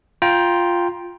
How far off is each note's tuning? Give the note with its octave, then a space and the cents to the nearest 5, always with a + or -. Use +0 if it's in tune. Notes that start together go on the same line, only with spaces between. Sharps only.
F4 +0 G5 +0 A#5 +30